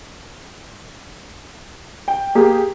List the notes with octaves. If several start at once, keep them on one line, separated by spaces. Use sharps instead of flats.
G5
A#3 G4 G#4